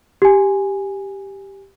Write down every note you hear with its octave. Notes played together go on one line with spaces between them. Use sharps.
G4 G#5